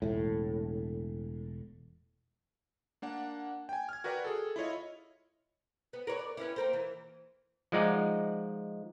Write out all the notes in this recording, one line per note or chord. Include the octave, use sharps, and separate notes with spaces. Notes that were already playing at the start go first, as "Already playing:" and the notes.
E1 A2
A#3 D4 F#5
G5 G#5
F6 G#6
F#4 A#4 B4 D5 G5
G#4 A4
E4 F4 C#5 D#5
B3
A#4 B4 C#5
D5
B3 C#4 E4
A#3 A#4 C5
E3
F3 G#3 D#4 D5 F#5